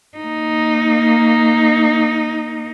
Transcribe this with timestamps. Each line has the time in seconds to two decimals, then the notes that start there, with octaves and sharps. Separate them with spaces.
0.18 A#3 D#4